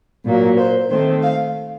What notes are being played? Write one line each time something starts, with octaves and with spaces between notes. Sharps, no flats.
A#2 F#3 A#3
C5
D#3 A3 C4 C5
F5